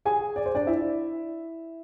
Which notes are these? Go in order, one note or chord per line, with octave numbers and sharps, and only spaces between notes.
G#4 G#5
D5
C5
D4 D5
E4 E5